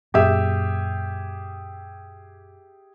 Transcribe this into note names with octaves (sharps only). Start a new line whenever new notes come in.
F#2 A#2 G4 G#4 E5